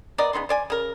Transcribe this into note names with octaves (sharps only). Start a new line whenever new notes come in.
B3 A#4 D5 D#5
C#3 B3 D#4 C6
C5 D5 G#5
C#3 A#4